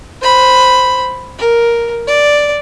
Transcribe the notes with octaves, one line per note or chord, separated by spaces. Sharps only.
C5 B5
A#4
D5